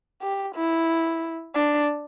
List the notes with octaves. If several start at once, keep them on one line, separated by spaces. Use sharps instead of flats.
G4
E4
D4